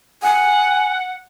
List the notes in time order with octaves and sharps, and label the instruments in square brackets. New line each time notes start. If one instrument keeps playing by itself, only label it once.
[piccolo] F#5 [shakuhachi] G#5